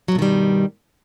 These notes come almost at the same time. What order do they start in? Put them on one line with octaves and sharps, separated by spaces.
F#3 G2 B2 D#3 G3